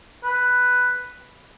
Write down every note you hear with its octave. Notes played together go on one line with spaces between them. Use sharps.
B4